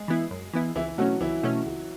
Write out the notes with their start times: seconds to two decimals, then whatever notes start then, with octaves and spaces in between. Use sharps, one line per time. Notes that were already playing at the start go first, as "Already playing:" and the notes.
Already playing: G#3 G#4
0.08 E3 B3 E4
0.31 F#2
0.53 E3 B3 E4
0.75 C#2 E3 E4
0.98 B2 F#3 A3 C#4 F#4
1.21 C#2 E3 E4
1.43 B2 A3 C#4
1.66 C#2